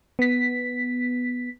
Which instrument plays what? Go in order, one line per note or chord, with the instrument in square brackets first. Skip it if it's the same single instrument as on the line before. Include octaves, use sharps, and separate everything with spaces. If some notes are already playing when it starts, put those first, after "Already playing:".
[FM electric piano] B3 B6